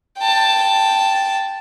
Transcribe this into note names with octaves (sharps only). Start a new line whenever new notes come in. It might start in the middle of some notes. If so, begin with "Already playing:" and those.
G5 A5